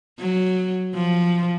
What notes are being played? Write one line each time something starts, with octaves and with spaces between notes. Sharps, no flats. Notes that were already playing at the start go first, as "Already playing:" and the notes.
F#3
F3